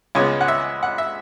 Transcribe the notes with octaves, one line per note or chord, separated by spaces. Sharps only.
C#2 C#3 G#3 B3 C#5
F#5
E5
F#5
E5